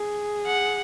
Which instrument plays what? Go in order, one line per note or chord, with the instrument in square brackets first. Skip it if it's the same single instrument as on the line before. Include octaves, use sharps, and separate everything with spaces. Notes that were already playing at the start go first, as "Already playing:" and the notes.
Already playing: [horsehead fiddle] G#4
[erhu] F#5